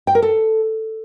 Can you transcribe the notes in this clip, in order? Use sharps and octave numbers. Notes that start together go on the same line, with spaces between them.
G5
A#4
A4